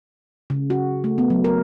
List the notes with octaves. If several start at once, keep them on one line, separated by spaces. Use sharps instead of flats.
C#3
F#4
A3
B3
F#3
A#4